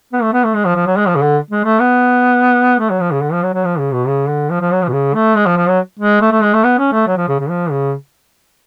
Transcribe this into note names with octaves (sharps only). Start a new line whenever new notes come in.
B3
A3
B3
A3
G#3
F3
F3
F#3
G#3
F3
C#3
D3
G#3
A3
B3
A3
F#3
F3
C#3
D3
F3
F#3
F#3
F3
C#3
B2
C#3
D3
F3
F3
F#3
F3
B2
C#3
A3
G#3
F3
F3
F#3
G#3
A3
A3
G#3
A3
B3
C#4
A3
F#3
F3
C#3
C#3
F3
C#3